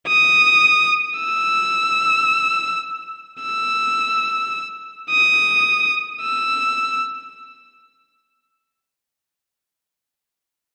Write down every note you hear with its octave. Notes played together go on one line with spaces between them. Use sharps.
D#6
E6
E6
D#6
E6